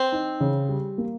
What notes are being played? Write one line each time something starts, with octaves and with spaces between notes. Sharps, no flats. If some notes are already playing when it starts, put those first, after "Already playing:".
Already playing: C4
D#4
C#3
G3
A#3